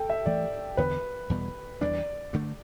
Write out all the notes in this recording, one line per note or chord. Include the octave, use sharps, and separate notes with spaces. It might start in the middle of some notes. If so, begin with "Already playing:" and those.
Already playing: A4 G5
E5
G2 E3 A3 D5
E2 D3 B3 B4
E2 B2 G3
E2 E3 G3 D4 D5
G2 D3 A3